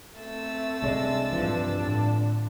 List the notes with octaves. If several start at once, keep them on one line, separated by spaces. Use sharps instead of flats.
A3 C4 E6 A6
C2 G#3 D4
G2 E3 F3 D4
A2 D3